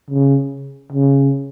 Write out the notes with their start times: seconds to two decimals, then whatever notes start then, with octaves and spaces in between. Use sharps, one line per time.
0.10 C#3
0.93 C#3